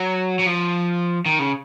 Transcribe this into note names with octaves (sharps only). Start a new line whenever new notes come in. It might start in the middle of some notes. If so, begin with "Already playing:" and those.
Already playing: F#3
F#3
F3
D#3
C#3